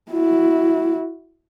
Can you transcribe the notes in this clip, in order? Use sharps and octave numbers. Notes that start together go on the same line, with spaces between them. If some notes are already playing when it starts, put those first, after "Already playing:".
E4 F#4